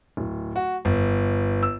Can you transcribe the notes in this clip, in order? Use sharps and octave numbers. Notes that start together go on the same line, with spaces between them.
D1
F#4
G1
E6